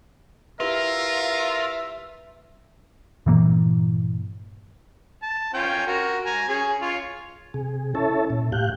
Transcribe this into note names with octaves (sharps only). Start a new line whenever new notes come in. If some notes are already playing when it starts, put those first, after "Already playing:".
E4 F4 G4 A#4 B4 E5
G2 A#2 E3 A#3
A5
C#4 F4 G5
F#4 A#4
G#5 A#5
C#4 G#4
F4 C#5
C3 G#4
C#4 E4 A4 C#5 E5 A5
A#2
A2 G4 F5 F#6 G6